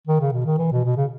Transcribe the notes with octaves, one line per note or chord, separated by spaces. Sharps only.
D#3
C#3
B2
D#3
E3
B2
B2
C#3